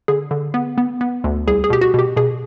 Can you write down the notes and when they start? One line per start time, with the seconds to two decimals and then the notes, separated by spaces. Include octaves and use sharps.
0.08 D3 G#4
0.31 D3
0.54 B3
0.78 B3
1.01 B3
1.24 D2
1.47 C2 G#4
1.64 G#4
1.70 B2 G4
1.81 F#4
1.94 B2 G4
2.17 B2 G#4